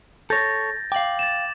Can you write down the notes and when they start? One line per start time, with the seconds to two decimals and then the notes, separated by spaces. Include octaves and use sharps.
0.30 A4 C#5 G6 A6 A#6
0.92 F5 G5 D6 F#7
1.19 A6 E7